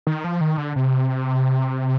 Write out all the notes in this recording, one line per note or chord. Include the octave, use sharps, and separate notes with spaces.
D#3
F3
D#3
D3
C3